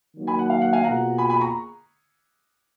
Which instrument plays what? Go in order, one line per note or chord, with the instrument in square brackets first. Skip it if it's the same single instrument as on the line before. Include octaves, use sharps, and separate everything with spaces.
[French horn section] D#3 F#3 A#3 D#4
[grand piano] G#5 B5
F#5
F5
F#5
F5 G#5
[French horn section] B2 A#3 F4 G#4 [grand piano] F#5 A#5
[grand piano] G#5 B5
G#5 B5
A#5 C#6